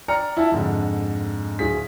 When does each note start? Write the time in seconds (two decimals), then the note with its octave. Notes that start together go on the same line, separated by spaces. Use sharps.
0.08 D5 G5 A#5 F6 C#7
0.37 E4 F4 E5 G5 A5
0.52 F2 G#2 D3
1.59 D1 G#4 B6